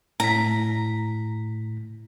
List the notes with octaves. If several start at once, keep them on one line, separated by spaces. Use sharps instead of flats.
A2 A#5 B6